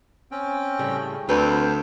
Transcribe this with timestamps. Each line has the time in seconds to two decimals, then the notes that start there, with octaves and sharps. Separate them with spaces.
0.31 C4 C#4 G5
0.79 A2 C#3 G3
1.29 D2 C4 B4 C5